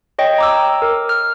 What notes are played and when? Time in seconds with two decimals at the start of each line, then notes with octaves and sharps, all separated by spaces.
0.19 C#5 D#5 G5
0.38 A#5 D6 E6
0.82 A#4
1.09 F6